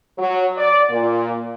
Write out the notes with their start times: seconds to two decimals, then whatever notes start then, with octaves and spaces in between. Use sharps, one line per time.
0.19 F#3
0.58 D5
0.90 A#2